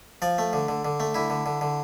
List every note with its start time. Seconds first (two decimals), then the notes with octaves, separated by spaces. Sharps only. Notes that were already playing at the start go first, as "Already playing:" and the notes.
0.22 F3 D5
0.38 A3
0.53 D3
0.68 D3
0.85 D3
1.00 A3
1.14 D3 E4
1.30 D3
1.46 D3
1.61 D3